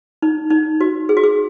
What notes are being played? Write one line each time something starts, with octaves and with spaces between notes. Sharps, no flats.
D#4
D#4
F#4
G#4
F#4
G#4